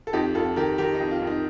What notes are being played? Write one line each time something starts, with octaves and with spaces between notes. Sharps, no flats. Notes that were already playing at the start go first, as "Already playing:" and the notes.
A4
F2 D#4 G4
F2 F4 A4
D#3 G4 A#4
D#3 G4 A#4
D#4
F2
F4
F2
D#4